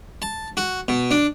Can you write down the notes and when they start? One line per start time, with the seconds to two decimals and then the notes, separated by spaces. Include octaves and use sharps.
0.22 A5
0.57 F#4
0.88 B2
1.11 D4